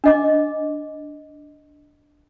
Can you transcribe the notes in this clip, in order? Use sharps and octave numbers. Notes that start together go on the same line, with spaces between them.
D4 D#5 D6